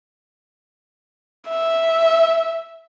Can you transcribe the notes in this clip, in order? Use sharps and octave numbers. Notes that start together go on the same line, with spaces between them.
E5